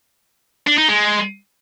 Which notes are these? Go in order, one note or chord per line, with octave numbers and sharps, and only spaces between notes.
D4
D#4
G#3